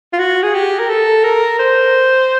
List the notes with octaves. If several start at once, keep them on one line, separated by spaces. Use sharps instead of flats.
F4
F#4
G#4
G4
A#4
A4
A#4
C5